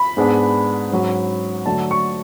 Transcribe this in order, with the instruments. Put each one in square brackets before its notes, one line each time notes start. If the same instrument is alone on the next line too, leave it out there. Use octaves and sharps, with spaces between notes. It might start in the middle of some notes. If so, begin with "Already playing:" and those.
Already playing: [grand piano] B5
G#2 G#3 B3 D4
G#2 F#3 C#4
D3 F#3 A3 A5
C#6